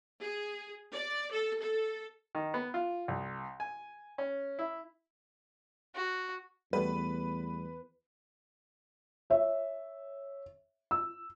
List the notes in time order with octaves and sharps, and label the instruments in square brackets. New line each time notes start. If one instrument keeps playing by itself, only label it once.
[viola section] G#4
D5
A4
A4
[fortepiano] D#3
B3
F4
C2
G#5
C#4
E4
[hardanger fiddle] F#4
[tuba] E2 [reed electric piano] G3 A3 B3 [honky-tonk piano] B4
[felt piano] C#5 E5
E6